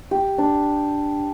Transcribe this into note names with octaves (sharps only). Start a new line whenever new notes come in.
G4
D4